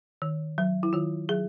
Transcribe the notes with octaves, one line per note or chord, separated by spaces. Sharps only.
D#3
F#3
E4
D#3 F4
F#3 G#4